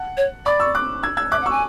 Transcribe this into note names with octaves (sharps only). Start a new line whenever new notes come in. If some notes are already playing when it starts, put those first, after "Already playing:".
Already playing: F#5 A5
C#5
D5 B5 D6
C#6 E6
D6 F#6
E6 G#6
E6 G#6
E5 D6 F#6
F#5
C#6 E6
G#5